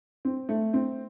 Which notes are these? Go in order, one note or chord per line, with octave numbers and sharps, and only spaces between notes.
C4
A3
C4